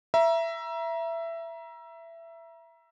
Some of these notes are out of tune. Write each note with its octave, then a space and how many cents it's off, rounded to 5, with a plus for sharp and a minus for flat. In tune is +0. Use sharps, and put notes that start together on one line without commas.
E5 +15 A#5 +30